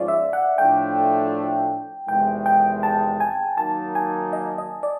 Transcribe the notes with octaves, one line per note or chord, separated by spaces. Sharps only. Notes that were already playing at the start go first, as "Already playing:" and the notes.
Already playing: G#2 F3 G#3 C#4 F4 D5
E5
F#5
A2 F3 A3 D4 G5
E2 C3 D#3 G#3 G5
G5
A5
G#5
D#3 F#3 A#3 D#4 A5
G#5
D#5
D#5
D5